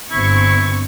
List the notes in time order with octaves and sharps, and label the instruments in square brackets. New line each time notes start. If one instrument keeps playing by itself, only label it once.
[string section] G1 C4 C#6 [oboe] E4